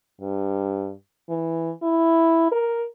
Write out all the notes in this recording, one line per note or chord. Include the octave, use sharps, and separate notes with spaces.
G2
E3
E4
A#4